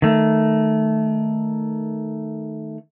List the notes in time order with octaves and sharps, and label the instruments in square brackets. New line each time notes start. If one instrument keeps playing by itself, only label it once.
[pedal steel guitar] D#3 A3